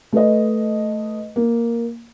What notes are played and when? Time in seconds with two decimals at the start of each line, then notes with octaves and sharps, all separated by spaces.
0.13 A3 B4 D#5
1.36 A#3